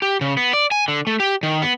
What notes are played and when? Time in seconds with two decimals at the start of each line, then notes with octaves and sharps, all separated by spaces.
0.02 G4
0.21 C#3
0.37 B3
0.53 D5
0.71 G#5
0.88 D3
1.07 A3
1.20 G4
1.43 D#3
1.62 B3